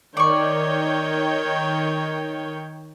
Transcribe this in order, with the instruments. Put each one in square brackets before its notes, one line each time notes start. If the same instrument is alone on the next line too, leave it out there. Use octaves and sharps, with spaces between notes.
[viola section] D#3 C#5 G5 [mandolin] D5 C#6